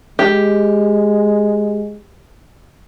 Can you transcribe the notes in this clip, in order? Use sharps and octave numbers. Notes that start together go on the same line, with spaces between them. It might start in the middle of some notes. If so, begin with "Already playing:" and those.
G#3 G4